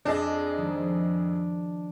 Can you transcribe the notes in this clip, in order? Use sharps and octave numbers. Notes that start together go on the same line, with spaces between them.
F2 D4 G#4 D#5
D#3 F3 G#3